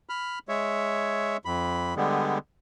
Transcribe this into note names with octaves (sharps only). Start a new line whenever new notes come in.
B5 F6
G#3 C#5 E5
F2 B5
D3 G3 G#3 B3